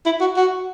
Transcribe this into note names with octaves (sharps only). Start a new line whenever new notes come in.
E4
F#4
F#4